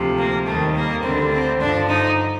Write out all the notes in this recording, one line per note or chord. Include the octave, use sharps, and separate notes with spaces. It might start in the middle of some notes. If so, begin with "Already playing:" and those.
Already playing: D2 C3 F3
A#3
D#2 D#3 G3 A3
A#3
D2 D3 G3 C4
C4
G2 D3 F3 D4
D#4